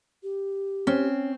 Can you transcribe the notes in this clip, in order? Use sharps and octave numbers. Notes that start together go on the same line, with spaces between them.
G4
C4 C#4